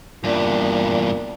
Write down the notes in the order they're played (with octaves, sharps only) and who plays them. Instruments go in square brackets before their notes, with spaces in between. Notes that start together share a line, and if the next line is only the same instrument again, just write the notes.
[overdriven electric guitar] E2 G2 [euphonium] A#2 [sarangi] D4